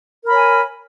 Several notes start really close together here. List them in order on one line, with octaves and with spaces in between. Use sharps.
A#4 B5 C#5 G#5